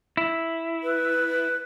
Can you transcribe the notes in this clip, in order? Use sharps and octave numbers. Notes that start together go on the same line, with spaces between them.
E4
B4